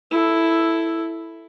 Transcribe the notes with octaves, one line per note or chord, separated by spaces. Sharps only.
E4 A4